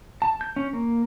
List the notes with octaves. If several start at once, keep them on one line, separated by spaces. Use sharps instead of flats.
A5
G6
C#4
A#3